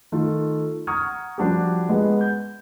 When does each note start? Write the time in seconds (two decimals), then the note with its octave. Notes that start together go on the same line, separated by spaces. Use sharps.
0.12 D#3 A3 F4
0.87 F#5 A#5 C#6 D#6 F6 G#6
1.38 F3 G3 D4 F#4 G4
1.89 G#3 B3
2.21 G6